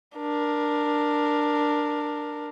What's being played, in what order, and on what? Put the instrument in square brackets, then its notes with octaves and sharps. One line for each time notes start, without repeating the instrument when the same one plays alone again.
[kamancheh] D4 A#4